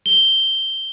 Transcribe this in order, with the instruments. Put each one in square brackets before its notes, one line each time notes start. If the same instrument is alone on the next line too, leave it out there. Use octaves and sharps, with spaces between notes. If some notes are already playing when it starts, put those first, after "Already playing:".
[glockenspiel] G7